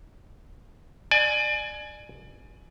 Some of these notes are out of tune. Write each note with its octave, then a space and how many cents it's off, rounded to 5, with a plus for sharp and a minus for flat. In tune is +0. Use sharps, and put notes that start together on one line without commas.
D5 +30 G#5 +15